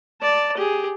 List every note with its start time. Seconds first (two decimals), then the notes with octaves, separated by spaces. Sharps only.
0.21 D5 A5
0.57 G4 G#4